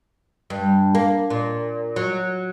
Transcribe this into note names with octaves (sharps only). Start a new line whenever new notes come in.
G2
A#3
A#2
F#3